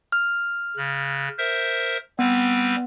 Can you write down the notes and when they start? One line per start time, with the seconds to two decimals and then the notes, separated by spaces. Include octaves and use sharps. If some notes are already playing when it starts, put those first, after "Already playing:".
0.12 F6
0.77 C#3 F#6
1.38 A#4 C5 E5
2.19 G3 B3 C4 B4